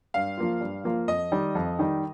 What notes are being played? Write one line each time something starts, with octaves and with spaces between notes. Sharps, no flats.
G2 F5
F3 A#3 F4
G2
F3 A#3 F4
F2 D#5
D#3 G3
F2
D#3 G3